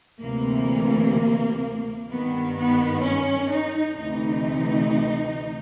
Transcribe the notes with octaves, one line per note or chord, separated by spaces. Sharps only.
D2 C3 E3 A#3
G2 D#3 B3
B3
C#4
D#4
D2 C3 E3 D#4